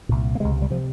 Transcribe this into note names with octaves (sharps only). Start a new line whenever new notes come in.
C2 A#2
A#3
C#2 C3 G#3
G3
C3 F3